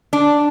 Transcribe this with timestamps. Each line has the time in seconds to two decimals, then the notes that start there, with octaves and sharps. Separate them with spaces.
0.13 D4